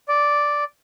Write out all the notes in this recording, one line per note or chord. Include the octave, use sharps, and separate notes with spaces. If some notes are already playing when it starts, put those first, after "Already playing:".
D5